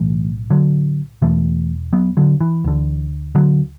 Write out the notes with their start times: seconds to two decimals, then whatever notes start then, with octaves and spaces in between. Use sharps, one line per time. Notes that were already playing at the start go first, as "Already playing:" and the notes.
Already playing: B1 A2 E3 A3
0.50 D3 F#3
1.22 E1 E2 B2 E3 A3
1.93 F#3 B3
2.17 D3 F#3
2.41 E3
2.64 D2 D3
3.35 D3 F#3